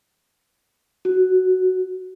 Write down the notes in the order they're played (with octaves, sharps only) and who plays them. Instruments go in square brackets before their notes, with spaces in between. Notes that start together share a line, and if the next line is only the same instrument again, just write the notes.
[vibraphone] F#4